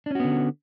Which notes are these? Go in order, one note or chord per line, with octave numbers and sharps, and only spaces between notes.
D3 B3 C#4 D4 F#4